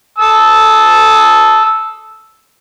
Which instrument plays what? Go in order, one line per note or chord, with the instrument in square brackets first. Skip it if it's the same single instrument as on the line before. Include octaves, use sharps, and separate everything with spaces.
[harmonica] A5 D#6 E6